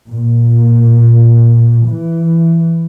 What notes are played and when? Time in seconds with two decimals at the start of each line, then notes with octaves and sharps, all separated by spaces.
0.11 A#2
1.88 E3